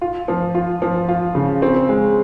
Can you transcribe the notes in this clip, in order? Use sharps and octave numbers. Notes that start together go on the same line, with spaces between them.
F4
F3
F4
F3
F4
C#3
C4
G#3